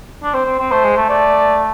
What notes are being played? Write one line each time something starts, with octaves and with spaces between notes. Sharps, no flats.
D4
C4 C5
C4
C4
A3 C5
G#3
A3
A3 D5